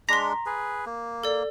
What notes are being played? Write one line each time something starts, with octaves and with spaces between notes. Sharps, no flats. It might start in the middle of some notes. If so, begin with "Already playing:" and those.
G#3 D4 A#5 C6 B6
G#4 B4
A#3
A4 D5